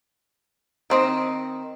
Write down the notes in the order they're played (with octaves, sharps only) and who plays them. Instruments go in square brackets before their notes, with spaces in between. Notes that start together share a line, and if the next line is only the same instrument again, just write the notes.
[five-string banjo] D#3 C4 D#5